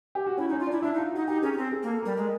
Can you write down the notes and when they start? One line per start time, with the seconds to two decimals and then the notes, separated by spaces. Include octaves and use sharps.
0.15 G4
0.26 F#4
0.37 C#4 E4
0.49 D#4
0.52 C#4
0.60 F4
0.67 D4 E4
0.82 D4 E4
0.94 D#4
0.98 F4
1.13 D#4 F#4
1.27 D#4 G4
1.42 C#4 G#4
1.53 C#4
1.58 C4
1.72 G#4
1.83 A#3
1.88 A4
2.03 G3 A#4
2.17 G#3 A#4